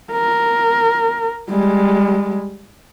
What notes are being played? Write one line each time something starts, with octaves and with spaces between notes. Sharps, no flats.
A#4
G3 G#3